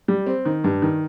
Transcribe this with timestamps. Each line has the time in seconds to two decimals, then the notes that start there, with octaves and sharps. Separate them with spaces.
0.08 G3
0.26 C4
0.45 D#3
0.64 G2
0.82 D#3